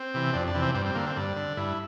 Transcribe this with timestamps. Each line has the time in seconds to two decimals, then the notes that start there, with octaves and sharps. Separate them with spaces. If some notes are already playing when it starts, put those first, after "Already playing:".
Already playing: C4
0.14 C3 E3
0.34 F2 D4
0.47 D4
0.54 C3 E3
0.62 C4
0.74 G2 C4
0.86 C4
0.95 D3 A#3
1.06 C4
1.16 G2 D4
1.37 D3
1.57 G2 E4